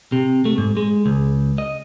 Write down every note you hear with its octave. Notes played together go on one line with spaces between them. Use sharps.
C3
A3
G#2
G#3
C#2
D#5